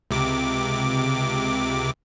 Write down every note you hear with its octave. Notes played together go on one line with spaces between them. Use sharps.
C#2 C3 D6